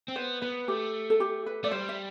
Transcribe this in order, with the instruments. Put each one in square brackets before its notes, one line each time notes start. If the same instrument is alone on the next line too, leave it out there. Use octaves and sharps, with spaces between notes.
[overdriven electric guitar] C4
[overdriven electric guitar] B3 [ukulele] C5
[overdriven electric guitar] B3 [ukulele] B4
[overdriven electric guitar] A3 [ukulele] G4
[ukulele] A4
G4
B4
[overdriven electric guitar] A3 [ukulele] D5
[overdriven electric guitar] G3 [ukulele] C5
[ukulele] E5